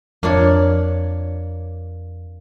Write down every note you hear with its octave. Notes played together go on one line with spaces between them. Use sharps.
F2 A#3 D4 C#5